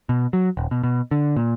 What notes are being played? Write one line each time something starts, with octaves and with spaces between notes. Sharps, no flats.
B2
F#3
D#1
B2
B2
D3
A#2